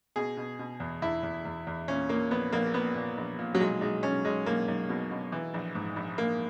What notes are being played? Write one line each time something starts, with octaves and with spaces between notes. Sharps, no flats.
B2 G#4
B2
B2
E2
E2 E4
E2
E2
E2
A#2 C#4
A#2 A#3
A#1 B3
A#1 A#3
A#2 B3
A#2
A#1
A#2
F#3
B1 G#3
B1 G#3
B1 C#4
B1 G#3
B1 A#3
B1
B2
B2
E3
A#1
G#2
A#1
A#1 A#3